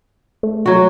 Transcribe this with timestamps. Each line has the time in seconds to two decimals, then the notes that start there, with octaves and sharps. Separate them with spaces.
0.43 A3
0.66 F#3 F#4